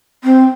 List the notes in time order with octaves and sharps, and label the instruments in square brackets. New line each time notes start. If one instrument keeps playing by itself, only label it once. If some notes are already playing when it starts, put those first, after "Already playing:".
[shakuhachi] C4